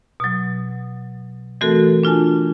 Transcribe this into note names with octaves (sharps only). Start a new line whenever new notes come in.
B2 F#3
E3 A3 C4 F#4 A4 A#4
D4 F4 G#5 A5